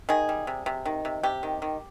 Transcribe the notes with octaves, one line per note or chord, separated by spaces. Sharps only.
D#3 G#4
G3
C3
C3
D#3
C3
C3 G4
D#3
D#3